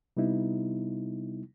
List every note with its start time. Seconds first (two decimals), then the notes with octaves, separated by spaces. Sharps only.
0.17 C3 G3 B3 D#4 E4